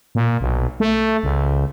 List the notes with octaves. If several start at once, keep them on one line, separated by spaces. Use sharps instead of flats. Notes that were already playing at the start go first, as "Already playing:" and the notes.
A#2
B1
A3
C#2